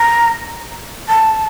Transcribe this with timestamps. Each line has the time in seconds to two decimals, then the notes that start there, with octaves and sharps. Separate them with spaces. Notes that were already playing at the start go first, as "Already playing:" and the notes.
Already playing: A#5
1.09 A5